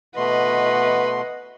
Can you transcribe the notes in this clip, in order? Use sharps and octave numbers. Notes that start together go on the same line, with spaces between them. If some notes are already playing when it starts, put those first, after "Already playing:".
B2 A3 B4 D#5 F#5 C6